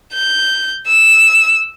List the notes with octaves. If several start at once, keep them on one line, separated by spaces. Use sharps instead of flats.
G6
E6